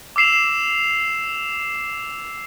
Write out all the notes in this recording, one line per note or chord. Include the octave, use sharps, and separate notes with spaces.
D6 E6 C7 E7 F7